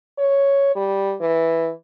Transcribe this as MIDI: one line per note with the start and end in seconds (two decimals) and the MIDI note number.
0.18 0.75 73
0.75 1.15 55
1.21 1.71 52